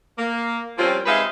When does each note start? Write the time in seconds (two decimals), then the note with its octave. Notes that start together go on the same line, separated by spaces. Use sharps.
0.18 A#3
0.78 F3 G3 A#3 C4 C#4 F4
1.06 C3 G#3 D#4 B4 E5 F5